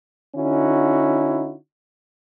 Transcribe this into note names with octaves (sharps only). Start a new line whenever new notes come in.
D3 C#4 D#4 E4 F#4